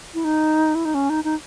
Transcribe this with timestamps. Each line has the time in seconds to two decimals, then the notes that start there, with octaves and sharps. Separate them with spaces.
0.14 E4
0.24 D#4
0.75 E4
0.85 D#4
0.94 C#4
1.10 D#4
1.24 D#4